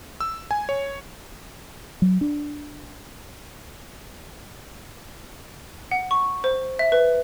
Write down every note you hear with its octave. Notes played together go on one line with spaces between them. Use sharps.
E6
G#5
C#5
F#3
D4
F#5
C#6
C5
E5
B4